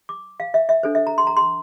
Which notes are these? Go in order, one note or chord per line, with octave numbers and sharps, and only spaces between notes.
D6
F5
E5
E5
D4 A4 C5
E5
A#5
C6
A#5
C6